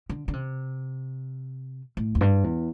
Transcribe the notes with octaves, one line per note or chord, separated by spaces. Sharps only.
D3
D3
C3
A2
E2
G2
E2